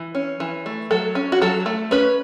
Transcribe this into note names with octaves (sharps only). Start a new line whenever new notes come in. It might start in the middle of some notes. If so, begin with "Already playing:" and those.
Already playing: E3
C#4
E3
A3
F#3 A4
C#4
F#4
F#3 A4
A3
C#4 B4